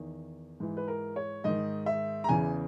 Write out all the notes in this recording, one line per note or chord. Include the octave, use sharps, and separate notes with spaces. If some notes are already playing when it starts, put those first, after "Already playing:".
Already playing: E2 D#3
G#2 E3
B4
A#4
C#5
G#2 D#3 D#5
E5
A#5
E2 C#3 E3 G#5